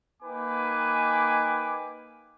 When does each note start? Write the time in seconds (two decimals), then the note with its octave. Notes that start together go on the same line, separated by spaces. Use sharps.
0.23 A#3 D#4 B4 G5 G#5 D6